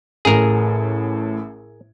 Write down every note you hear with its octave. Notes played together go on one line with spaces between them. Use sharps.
A1 A2 G#4 A#4